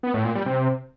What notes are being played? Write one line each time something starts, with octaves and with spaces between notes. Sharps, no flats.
B3
A2
A#2
G3
C3